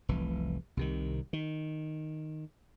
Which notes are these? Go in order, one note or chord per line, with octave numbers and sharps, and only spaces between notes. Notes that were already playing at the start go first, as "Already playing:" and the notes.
F1 C2 E3
C2 C3 D#3
D#3